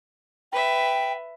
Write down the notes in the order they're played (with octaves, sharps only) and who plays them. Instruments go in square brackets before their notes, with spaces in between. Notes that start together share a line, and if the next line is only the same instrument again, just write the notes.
[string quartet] B4 E5 [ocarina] G5